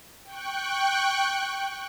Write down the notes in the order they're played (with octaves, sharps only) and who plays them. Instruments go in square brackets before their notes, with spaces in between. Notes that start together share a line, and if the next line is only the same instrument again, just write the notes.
[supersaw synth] G5 C#6 F#6